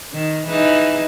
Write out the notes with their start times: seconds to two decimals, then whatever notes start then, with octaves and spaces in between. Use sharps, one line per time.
0.13 D#3
0.46 E3 G#3 D#4